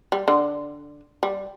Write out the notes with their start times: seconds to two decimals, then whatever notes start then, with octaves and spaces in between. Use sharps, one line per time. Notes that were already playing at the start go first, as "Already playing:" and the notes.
0.12 G3
0.28 D3
1.23 G3